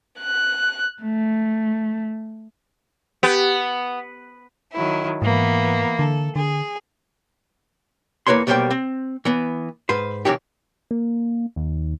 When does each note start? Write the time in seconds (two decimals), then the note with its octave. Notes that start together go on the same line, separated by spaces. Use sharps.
0.20 F#6
1.03 A3
3.23 B3 G4
4.74 D#3 F#3 E4
5.22 G#2 E3 A#3 B3
5.99 D3 A4
6.36 D3 G#4
8.27 E2 A#3 E4 B4 C#5 C6
8.47 B1 B2 G3 A#3 C5 G5
8.71 C4
9.25 E3 B3
9.89 G#2 B4 C5
10.25 C#2 C3 D#3 E3 F#3 G4
10.91 A#3
11.56 D#2